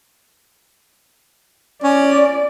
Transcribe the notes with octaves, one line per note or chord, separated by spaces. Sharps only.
C#4 D5